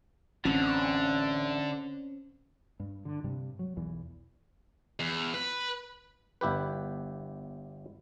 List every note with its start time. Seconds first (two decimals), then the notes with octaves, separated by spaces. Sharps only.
0.45 A1 D3 C4 C#4
2.80 G2
3.05 D3
3.24 G2 C3 G3
3.59 F#3
3.76 B1 E2 E3
5.00 E2
5.34 B4
6.41 G1 E4 G4 B4